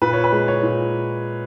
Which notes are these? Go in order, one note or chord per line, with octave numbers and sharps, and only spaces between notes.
A#2 B4
C#5
B4
G#3
C#5
A#2